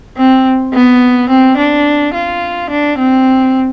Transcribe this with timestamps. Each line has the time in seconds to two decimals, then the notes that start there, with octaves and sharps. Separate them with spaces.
0.17 C4
0.73 B3
1.29 C4
1.57 D4
2.14 F4
2.70 D4
2.99 C4